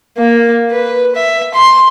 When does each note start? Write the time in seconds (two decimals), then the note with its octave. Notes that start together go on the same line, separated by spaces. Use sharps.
0.18 A#3
0.71 B4
1.15 E5
1.54 C6